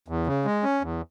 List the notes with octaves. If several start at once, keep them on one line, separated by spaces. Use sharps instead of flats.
E2
C#3
G#3
C#4
E2